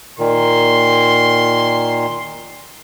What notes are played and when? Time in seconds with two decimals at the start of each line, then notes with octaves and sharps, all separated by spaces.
0.19 A#2 D#3 C6